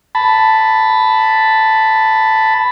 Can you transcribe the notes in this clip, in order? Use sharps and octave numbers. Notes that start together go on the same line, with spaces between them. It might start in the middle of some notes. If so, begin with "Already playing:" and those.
A5 B5